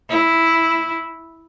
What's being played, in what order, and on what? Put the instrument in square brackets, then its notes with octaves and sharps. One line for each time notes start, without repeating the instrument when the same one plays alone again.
[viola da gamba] E4